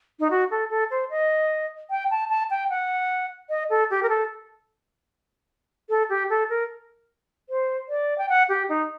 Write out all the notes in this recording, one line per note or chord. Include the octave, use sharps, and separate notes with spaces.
D#4
F#4
A4
A4
C5
D#5
G5
A5
A5
G5
F#5
D#5
A4
G4
A#4
A4
A4
G4
A4
A#4
C5
D5
G5
F#5
G4
D#4